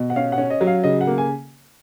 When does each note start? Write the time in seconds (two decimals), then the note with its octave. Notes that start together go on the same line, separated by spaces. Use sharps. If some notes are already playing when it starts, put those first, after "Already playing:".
Already playing: B2
0.10 F#5
0.16 C#4 F5
0.32 F#5
0.38 C#4
0.50 D#5
0.61 F#3
0.67 F5
0.84 C#3 D#5
1.01 F#5
1.07 A#3
1.18 G#5